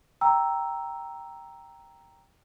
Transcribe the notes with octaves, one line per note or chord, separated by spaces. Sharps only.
G5 A#5 E6